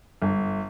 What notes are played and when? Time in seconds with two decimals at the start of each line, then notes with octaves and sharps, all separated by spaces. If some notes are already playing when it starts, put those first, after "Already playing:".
0.22 G1